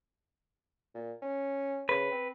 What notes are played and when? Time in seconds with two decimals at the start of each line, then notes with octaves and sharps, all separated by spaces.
0.95 A#2
1.22 C#4
1.89 C#3 B4
2.11 C4